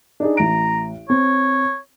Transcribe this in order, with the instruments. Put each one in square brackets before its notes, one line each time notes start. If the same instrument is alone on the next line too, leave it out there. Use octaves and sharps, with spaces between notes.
[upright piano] D4 D#4 G#4
[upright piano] A1 D7 [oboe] A#5
[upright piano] C4 [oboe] C#5